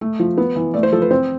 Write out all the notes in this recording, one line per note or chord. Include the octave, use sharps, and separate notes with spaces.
A3
F3
B3
E3
A3 D5
C5
F3 A4
B4
C4 C5